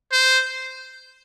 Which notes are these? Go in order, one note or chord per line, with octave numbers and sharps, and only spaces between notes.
C5